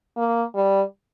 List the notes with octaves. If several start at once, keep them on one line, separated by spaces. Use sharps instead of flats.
A#3
G3